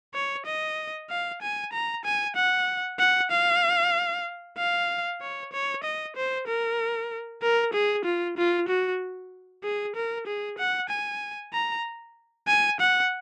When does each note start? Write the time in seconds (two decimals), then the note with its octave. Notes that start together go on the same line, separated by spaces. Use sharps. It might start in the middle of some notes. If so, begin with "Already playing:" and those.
0.14 C#5
0.46 D#5
1.10 F5
1.42 G#5
1.73 A#5
2.05 G#5
2.36 F#5
2.99 F#5
3.31 F5
4.58 F5
5.21 C#5
5.53 C#5
5.84 D#5
6.16 C5
6.47 A#4
7.42 A#4
7.74 G#4
8.05 F4
8.37 F4
8.68 F#4
9.64 G#4
9.96 A#4
10.27 G#4
10.58 F#5
10.90 G#5
11.53 A#5
12.48 G#5
12.80 F#5